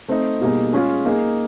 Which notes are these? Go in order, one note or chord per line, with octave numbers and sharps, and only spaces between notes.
A3 C4 D#4
B2 G3 A#3 D#4 G#4
G#3 C#4 F4 G#4
A#3 D#4 G#4